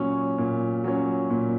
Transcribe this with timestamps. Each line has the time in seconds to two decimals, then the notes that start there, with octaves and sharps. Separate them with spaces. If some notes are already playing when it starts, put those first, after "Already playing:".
Already playing: A#2 F#3 C#4
0.38 A#2
0.84 F#3 C#4
1.30 A#2